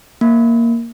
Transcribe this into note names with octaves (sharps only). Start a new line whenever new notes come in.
A#3